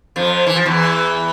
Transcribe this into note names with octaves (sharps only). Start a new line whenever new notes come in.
F2 F3
E3
F3
E2 E3